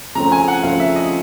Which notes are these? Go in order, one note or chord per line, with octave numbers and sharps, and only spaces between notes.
C#3 F3 A3 C4 A#5
G#5
F#5
C#3 F3 A3 C4 F5
E5
D#5